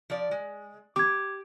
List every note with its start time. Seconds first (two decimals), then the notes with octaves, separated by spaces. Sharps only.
0.10 F3 D5
0.31 G#3
0.96 G4 D6 G#6